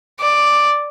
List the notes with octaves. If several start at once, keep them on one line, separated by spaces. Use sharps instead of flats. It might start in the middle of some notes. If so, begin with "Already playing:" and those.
D5